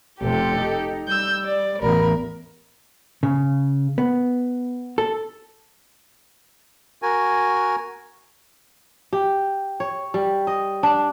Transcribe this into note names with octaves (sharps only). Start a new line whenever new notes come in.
F1 C3 G4 A4
D#4
G3 E6 G6
D5
A1 E2 A#4 B5
C#3
B3
A4
F#4 A#4 G#5
G4
C#5
G3
D#5
D4